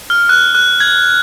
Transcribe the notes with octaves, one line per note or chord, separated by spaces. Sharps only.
F6
F#6
F#6
G#6